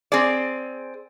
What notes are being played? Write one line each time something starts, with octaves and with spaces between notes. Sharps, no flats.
C4 G#4 D5